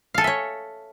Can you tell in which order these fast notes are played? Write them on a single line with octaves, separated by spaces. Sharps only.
F5 A4 G#5 E5 C#5